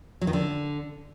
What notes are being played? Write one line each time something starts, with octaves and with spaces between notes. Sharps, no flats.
F#3
D#3
D3